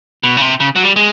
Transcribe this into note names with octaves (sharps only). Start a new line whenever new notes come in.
B2
C#3
C3
C#3
F#3
G3
G#3